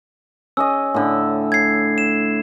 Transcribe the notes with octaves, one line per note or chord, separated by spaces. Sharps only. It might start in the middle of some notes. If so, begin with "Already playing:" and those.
C#4 G#4 D#5 E6
A2 D3
G#6 C7
E7